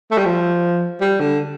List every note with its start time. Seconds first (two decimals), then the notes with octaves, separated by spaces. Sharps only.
0.11 A3
0.18 G3
0.25 F3
1.01 G3
1.20 D3